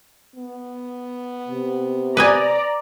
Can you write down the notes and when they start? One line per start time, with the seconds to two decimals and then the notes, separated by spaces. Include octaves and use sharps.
0.36 B3
1.48 C3
2.17 B4 D5 D#5 G#5 A#5